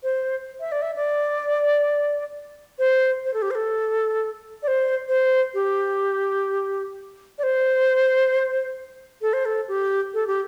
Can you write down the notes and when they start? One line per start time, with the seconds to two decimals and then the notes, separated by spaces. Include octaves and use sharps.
0.03 C5
0.60 E5
0.72 D5
0.82 E5
0.96 D5
2.79 C5
3.25 C5
3.34 A4
3.42 G4
3.51 C5
3.55 A4
4.63 D5
4.68 C5
5.09 C5
5.54 G4
7.38 D5
7.43 C5
9.22 A4
9.33 C5
9.45 A4
9.68 G4
10.14 A4
10.27 G4